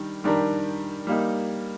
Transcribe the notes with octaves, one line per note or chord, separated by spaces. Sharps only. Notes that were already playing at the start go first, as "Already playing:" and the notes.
Already playing: D#3 G3 D4
D#3 G3 D4 G4 A#4
G3 A#3 D#4